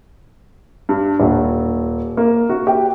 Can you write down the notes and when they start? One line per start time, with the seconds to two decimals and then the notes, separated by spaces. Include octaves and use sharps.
0.89 G2
1.20 D#1
2.17 A#3
2.50 F#4
2.67 G4